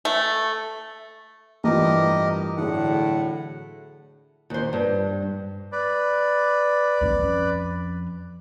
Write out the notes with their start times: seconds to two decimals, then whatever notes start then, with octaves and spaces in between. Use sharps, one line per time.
0.05 A3
1.64 G2 E3 A3 F4 G4 A#4 D#5
2.57 A2 D3 F#3 G#4 F#5
4.50 D#2 C5
4.73 G2
5.72 B4 D5
7.01 F2 C#4